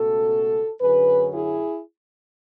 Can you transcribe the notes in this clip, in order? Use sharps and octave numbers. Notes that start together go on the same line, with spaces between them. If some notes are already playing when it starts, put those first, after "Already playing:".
Already playing: C#2 B2 A3 C#4 F#4 A4
F#2 D3 F#3 C#4 G#4 B4
E4 G#4